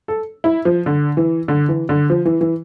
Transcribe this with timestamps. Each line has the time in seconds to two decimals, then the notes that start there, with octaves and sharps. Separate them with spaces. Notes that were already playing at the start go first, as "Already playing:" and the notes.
0.08 A4
0.44 E4
0.65 F3
0.86 D3
1.17 E3
1.48 D3
1.69 E3
1.89 D3
2.10 F3
2.25 E3
2.41 E3